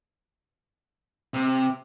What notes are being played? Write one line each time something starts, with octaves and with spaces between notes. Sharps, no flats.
C3